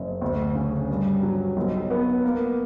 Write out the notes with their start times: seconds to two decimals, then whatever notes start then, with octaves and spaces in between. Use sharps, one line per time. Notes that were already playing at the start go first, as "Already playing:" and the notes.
Already playing: F#1
0.22 D2
0.55 C#3
0.90 G2
1.23 F#3
1.57 B1
1.91 B3
2.24 A#3